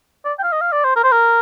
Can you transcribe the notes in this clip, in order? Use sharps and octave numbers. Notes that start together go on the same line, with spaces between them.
D5
G5
F5
D#5
F5
D5
C5
A#4
C5
A#4